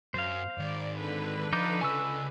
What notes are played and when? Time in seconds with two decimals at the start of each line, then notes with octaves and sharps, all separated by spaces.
0.14 F#2 C5 F5
0.58 G#2 D#3 D5
0.98 D3 B4
1.53 F3 D#4 D6 G6
1.81 C#3 D#5 G#5 C#6 E6